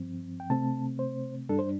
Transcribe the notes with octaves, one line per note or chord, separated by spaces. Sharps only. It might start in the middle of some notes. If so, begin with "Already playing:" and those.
Already playing: G2 F3 C4
G5
C3 A3 C4 A5
C5
G2 G3 D4 A4
C5